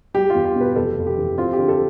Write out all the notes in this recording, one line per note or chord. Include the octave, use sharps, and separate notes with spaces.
G3 G4
F4
E2
G4
B2
B4
F1 A4
F2
G4
E3
C4 F4
G4
D3
A4